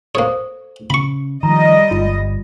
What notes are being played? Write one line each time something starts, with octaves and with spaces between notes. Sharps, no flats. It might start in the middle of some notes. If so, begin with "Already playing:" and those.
A#3 A4 C5 C#5
C#3 B5 C#6
D#3 F3 G3 D#5 A#5
G1 F4